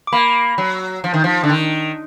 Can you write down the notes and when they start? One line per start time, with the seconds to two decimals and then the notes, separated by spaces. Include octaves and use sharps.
0.07 D6
0.12 A#3 B5
0.58 F#3
1.04 F3
1.14 D#3
1.24 F3
1.43 D3
1.50 D#3